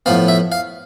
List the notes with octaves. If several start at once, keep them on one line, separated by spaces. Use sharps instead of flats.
A2 F3 B3 F5
E5
F5